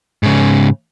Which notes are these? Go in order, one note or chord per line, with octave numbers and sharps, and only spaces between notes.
G#2 C#3